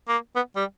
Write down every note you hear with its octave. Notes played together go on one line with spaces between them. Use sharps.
A#3
B3
G3